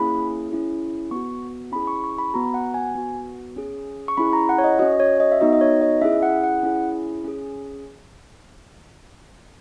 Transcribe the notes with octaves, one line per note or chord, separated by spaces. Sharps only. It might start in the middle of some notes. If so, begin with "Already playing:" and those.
Already playing: A#3 C#4 E4 G#4 B5
C#4 E4 G#4
B3 F#4 C#6
C#4 E4 G#4 B5
C#6
C#6
B5
B3 F#4 A#5
F#5
G#5
B3 F#4
C#4 G#4
C#6
C#4 E4 G#4 B5
A#5
F#5
C#5
D#5
C#4 F#4 D#5
C#5
D#5
E5
B3 D#4 F#4 D#5
D#5
C#5
D#5
C#4 E4 G#4 E5
F#5
F#5
C#4 E4 G#4
C#4 G#4